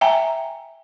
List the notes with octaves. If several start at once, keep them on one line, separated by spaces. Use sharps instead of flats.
E5 G5 G#5 A#5